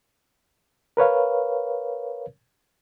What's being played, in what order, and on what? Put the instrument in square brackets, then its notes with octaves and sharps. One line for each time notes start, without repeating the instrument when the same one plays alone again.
[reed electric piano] A#4 B4 C#5 F5